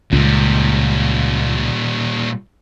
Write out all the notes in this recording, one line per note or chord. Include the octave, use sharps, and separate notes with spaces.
C#2 A#2 G3